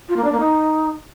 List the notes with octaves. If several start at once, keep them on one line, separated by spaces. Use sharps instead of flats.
F4
A#3
D4
A#3
D#4